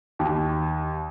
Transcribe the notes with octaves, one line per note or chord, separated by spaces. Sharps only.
D#2